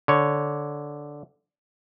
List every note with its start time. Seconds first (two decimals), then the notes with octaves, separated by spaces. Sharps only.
0.08 D3 C#5